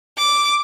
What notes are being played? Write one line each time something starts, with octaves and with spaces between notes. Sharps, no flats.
D6